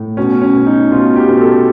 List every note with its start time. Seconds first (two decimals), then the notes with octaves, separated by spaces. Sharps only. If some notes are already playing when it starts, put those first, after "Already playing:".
Already playing: A2
0.17 B2 C#4
0.42 C#4
0.54 B2
0.66 D#4
0.91 B2 F4
1.16 G4
1.29 B2
1.41 A4